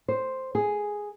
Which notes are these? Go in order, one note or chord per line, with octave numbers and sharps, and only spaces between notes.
C5
G#4